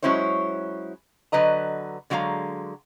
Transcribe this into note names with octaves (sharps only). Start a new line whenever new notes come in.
F#3 G#3 C#4 E4 C5 C#5
D3 F#3 B4 D#5 A#5
D3 F#3 G#3 F5 A#5